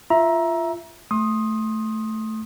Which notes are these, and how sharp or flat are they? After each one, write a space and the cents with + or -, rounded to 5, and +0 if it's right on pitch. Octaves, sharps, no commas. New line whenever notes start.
F4 -20 E5 +0 A#5 +20
A3 +0 C6 +30 D#6 +0